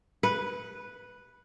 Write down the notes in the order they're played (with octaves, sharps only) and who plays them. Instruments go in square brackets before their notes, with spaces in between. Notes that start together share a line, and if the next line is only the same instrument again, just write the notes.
[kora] B4